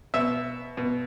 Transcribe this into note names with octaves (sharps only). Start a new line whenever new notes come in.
B2 E5
B2